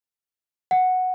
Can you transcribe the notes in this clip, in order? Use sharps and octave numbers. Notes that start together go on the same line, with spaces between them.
F#5